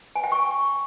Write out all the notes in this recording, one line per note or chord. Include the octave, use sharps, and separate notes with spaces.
G#5
G5
C#6